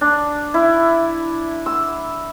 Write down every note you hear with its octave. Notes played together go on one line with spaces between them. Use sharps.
D4
E4
E6